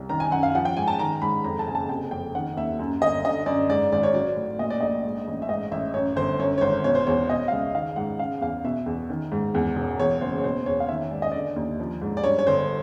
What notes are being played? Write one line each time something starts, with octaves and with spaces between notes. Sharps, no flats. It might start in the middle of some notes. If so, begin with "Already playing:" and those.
Already playing: C2
D#3 A#5
G#5
F#2 F#5
F5
F3 F#5
G5
G#2 G#5
A5
D#3 A#5
G#2 B5
F2 A#5
A5
F#1 G#5
A5
C3 G5
F2 G5
D#3 F#5
D#2 E5
F#2
G1 D#5
D3 D#5
F#2 D5
G#2 D5
G#1 D5
C#5
F#3 D5
A2
A#2 D#5
D5
A#1 D#5
G#2
A1
E5
G#2 D#5
A1 E5
F#2 C#5
G1 C5
F#2 C#5
C#5
G#1 C5
B2 C#5
C5
E2 C#5
B2 D#5
F5
C#2 E5
D#3 F5
G#2 F#5
C#3 F5
E2 F5
B2 E5
E2
D#3
G#2
E2
E1
E2 C#5
F#1 C5
C#5
B2 C5
E2 C#5
F5
D#3 E5
G#2 D5
D#5
D3 D5
D#2
F3
G#2
D5
G2 C#5
C#5
G1 C5